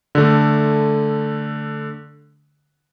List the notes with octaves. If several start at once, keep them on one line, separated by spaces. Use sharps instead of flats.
D3 A3